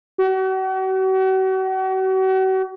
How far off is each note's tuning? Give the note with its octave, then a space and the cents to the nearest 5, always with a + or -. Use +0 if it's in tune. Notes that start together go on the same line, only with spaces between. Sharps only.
F#4 +40